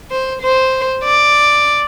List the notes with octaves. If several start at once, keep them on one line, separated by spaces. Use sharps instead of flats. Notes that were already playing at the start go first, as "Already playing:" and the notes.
C5
C5
D5